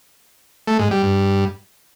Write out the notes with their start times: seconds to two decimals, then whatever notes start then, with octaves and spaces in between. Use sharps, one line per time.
0.67 A3
0.79 G#2
0.91 G3
1.03 G2